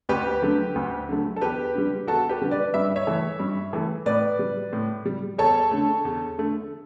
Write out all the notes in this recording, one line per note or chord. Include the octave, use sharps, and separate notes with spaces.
D2 G4 B4
D3 F#3 A3
D2
D3 F#3 A3
A4
E2 G4 B4
D3 G3
E2 F#4 A4
G4 B4
D3 G3
B4 D5
G2 E5
C#5 E5
E3 A3
G2
E3 A3
A2 B4 D5
G3
A2
G3
E2 A4 C#5
D3 A3
E2
D3 A3